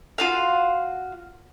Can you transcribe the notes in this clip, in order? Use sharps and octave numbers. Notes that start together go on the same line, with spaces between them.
F4 F#4 F5